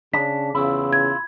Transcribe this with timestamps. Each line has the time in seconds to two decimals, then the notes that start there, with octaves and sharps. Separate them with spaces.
0.14 C#3 D4 B6
0.55 E2 C#3 E4 F4
0.93 G#6